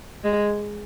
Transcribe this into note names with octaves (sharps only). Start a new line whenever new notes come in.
G#3